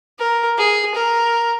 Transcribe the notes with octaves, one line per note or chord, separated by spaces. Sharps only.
A#4
G#4
A#4